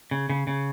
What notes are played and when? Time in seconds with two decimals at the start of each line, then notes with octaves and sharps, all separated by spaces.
0.11 C#3
0.29 C#3
0.47 C#3